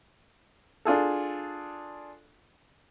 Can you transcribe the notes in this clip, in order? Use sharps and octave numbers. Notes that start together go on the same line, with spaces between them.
D4 F4 G#4 A4